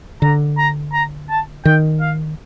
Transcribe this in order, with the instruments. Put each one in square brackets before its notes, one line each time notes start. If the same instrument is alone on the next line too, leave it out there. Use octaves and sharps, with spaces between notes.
[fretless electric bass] D3 [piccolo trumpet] A#5
[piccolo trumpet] A#5
A#5
A5
[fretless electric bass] D#3 [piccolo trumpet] G5
[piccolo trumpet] F5